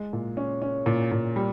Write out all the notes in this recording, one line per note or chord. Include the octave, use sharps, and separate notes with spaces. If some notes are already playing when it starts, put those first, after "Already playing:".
Already playing: G#3
A#2
C#4
C#4
A#2
A#2
G3